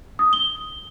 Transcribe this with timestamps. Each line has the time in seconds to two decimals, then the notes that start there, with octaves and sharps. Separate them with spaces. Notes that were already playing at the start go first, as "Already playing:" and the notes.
0.19 D#6
0.33 G7